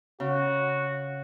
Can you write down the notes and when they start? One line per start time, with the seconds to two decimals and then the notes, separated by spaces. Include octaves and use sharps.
0.20 C#3 F#4